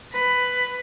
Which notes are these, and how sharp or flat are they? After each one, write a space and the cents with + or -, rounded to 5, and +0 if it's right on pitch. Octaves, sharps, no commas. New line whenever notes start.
B4 +10